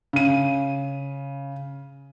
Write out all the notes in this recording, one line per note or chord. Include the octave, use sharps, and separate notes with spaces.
C#3 D#7